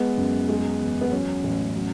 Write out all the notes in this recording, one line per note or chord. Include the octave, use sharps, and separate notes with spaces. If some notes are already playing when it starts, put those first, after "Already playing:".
Already playing: G#3 B3
F#2
G#3
E2
B3
F#3 C#4
A1
F#3